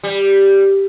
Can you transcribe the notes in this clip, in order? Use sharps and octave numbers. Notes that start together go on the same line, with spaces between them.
G3